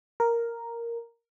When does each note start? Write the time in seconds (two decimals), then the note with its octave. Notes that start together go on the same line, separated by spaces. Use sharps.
0.20 A#4